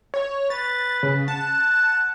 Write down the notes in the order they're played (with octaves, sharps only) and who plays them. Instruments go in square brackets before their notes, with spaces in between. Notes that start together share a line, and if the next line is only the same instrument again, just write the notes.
[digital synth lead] C#5
[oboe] B4 [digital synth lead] A6
[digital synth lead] C#3
[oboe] F#5 [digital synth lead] A5